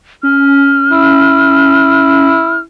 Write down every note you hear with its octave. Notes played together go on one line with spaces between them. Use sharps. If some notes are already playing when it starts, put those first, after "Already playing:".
C#4 F6
E4